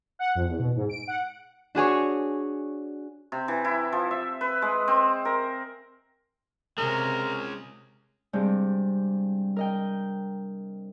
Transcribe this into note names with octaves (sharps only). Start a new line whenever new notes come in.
F#5
F2
E2
B2
G#2
D7
F#5
D4 F#4 G#4 C#5
C3
E3
E4
F3
E5
B4
G#3
C4
A#4
C3 G#3 C#4 A#4
G2 C3 G3 G#3
A#4 D#5 G5